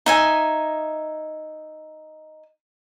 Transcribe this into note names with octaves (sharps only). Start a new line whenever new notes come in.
D#4 E5 G#5